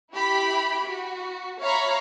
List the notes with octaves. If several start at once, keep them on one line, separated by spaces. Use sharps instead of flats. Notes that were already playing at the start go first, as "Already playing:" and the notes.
E4 G4 B5
F#4
C#5 E5 F5 A#5 B5 C#6